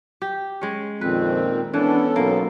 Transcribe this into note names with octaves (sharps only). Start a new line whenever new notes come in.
G4
G#3 C#4
F2 A#2 D#3 C4 B4
E3 B3 C#4 D4 A4
B1 A#3